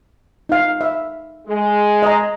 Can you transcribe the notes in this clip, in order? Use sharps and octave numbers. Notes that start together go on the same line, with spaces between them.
D#4 F5
E5
G#3
D#5 A#5